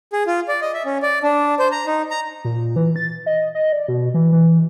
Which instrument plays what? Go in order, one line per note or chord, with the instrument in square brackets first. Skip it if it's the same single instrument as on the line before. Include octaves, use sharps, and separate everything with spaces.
[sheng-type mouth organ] G#4
F4
D5
D#5
E5
C#4
D5
D4
C5
A#5
D#4
A#5
[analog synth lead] A#2
E3
A6
D#5
D#5
D5
B2
E3
E3